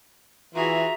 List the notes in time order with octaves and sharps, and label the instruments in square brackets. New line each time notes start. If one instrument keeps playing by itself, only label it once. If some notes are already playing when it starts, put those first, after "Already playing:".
[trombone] E3 [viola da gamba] F4 F#4 G#4 [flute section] E5 A#5